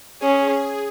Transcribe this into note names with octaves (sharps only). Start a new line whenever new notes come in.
C#4 G#4